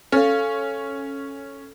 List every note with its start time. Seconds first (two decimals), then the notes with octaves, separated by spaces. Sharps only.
0.12 C#4 A4 F5